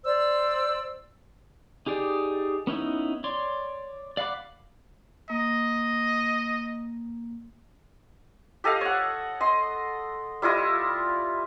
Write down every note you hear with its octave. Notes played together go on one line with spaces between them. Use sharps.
C5 D5 E6
D#4 G4 G#4 D5
B3 C#4 D#4 E4
C#5 D5 C6
D5 F5 F#5 B5 D6
A#3 D#5
G4 A4 D#5 F5
C#5 F#5
D#5 C6
G3 E4 F4 D#5